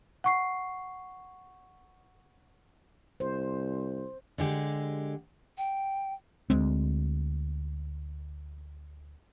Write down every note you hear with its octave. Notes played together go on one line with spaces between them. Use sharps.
F#5 C#6 C7
C2 C5
D3 G#3 G4
G5
D2 G#3 C4